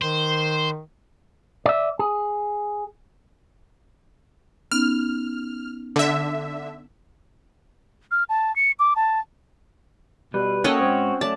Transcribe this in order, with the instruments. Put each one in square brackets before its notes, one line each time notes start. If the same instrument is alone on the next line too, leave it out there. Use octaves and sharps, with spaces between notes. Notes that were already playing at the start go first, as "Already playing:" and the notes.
[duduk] D#3 [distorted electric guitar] C5
[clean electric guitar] D5 E5
G#4
[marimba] B3 C#4 D#4 [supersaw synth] F6
[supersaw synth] D3 E5
[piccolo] F6
A5
C#7
D6
A5
[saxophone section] B2 [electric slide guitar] G3 [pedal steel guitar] B4
[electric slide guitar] A#3 [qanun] C#4 D#5 G5 [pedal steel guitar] F#4 C#5 F#5 [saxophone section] A4
[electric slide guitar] G#2 [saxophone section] C4
[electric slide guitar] F#3 A3 [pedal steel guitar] D5 [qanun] A5